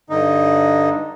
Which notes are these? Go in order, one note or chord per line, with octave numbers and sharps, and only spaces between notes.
G2 D3 D#4